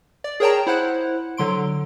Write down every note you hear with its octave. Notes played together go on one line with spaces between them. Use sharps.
D5
G#4 A#4 C#5 G5 A5 A#5
E4 C5 F#5 F#6
D3 F#3 C6 D7